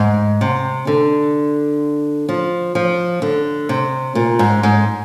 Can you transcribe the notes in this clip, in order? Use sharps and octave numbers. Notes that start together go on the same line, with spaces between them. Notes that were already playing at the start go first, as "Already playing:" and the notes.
Already playing: G#2
C3
D3
F3
F3
D3
C3
A#2
G#2
G#2